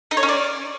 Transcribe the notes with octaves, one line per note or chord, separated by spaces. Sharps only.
D#4
C#5
C#4
D5